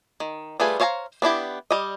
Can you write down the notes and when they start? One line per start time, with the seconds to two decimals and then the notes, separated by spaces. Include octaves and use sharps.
0.20 D#3
0.60 G3 A3 F4 G#4 B4
0.80 C5 C#5 F5 A5 A#5
1.22 B3 D4 E4 G4
1.71 G3 D#5